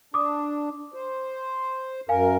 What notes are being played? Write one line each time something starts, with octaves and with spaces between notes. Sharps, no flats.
D4 D6 D#6
C5
F#2 A#4 F5 G#5